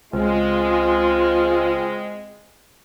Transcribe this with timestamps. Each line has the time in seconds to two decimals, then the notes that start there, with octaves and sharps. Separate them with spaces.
0.13 C#2 G#3 C4 F4